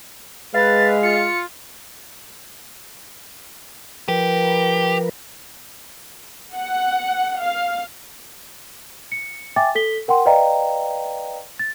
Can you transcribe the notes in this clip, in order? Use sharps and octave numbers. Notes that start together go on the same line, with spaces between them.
G#3 B4 F5 A6
F4 C#7
F3 G4 A#4 B4
F#5
F5
C#7
E5 G5 G#5 D6 A6
A4 B6 G7
A#4 F#5 G5 C6
B4 D5 D#5 F5 G5 A#5
A6